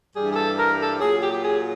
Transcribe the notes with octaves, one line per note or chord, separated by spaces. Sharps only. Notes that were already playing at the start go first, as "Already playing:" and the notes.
G2 E3 G3 G#4
G#4
A4
A#4
A4
A#2 F#3 G#4
G4
G4
G#4